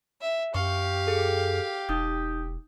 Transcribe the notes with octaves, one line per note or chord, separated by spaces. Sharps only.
E5
F#2 G4 F5 C#6
G#4 A4
E1 D#4 D#6 G6